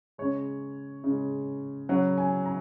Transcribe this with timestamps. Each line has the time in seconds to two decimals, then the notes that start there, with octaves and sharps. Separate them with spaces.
0.18 C#3 G#3 C#5
1.04 C#3 G#3
1.89 C#3 F#3 F#5
2.18 G#5
2.46 A#5